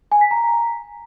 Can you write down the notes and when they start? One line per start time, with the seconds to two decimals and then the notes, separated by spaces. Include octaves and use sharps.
0.12 G#5
0.21 B6
0.31 A#5